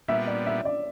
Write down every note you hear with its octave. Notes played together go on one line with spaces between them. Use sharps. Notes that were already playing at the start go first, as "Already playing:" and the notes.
A#2 G3 B3 E5
D5
E5
D5